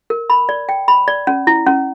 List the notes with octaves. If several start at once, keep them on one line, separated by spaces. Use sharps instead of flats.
A#4
B5
D5
G5
B5
D5
C#4
E4
C#4